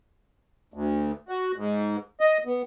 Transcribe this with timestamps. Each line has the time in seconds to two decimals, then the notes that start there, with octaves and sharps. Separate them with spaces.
0.74 D2
1.29 F#4
1.56 G#2
2.21 D#5
2.46 B3